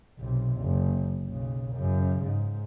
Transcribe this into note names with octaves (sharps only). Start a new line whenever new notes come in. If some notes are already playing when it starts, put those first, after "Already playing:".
B1 C3
F#1
B1 C#3
F#2 C#3
G#2